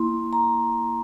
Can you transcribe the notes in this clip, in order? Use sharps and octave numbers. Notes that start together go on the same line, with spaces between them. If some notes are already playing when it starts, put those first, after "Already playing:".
Already playing: A#3 E4 C6
A#5